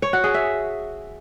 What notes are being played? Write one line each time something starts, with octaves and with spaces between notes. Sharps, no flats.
C#5
F#4
G#4
E5